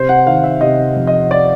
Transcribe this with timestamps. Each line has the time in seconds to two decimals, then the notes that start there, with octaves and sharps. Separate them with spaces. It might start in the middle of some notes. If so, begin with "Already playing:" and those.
Already playing: C3 C5
0.09 F#5
0.26 D#3 F5
0.44 E5
0.61 C3 D#5
0.96 F2
1.07 D#5
1.31 D5